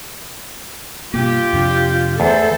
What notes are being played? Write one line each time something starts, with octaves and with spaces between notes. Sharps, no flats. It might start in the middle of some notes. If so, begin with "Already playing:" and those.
G2 B2 A#3 F4 G4
F2 C3 D4
E2 A3 A4 C5